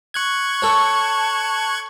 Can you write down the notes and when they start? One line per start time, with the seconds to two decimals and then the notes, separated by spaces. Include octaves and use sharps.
0.14 C#6 F#6 G#6
0.62 A4 C#5 A5